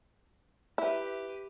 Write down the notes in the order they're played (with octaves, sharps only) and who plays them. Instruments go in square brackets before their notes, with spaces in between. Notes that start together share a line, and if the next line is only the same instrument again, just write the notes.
[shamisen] E4 [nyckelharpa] G4 B4